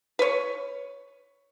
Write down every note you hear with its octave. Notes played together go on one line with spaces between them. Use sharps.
B4 C#5